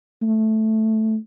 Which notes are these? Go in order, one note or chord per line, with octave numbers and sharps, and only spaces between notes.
A3